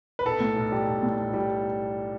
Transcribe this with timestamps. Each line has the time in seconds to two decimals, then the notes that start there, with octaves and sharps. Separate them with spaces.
0.19 B4
0.25 B1 A4
0.40 A2
0.56 B1
0.72 G3
0.87 B1
1.03 A2
1.18 B1
1.34 G3